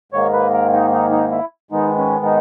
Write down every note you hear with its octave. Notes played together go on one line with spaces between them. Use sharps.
G#2 D#3 A#3 C#5
B4
A#4
D#4
D#4
D#4
E4
G#2 D#3 G#3 B3 D#4
C#4
D#4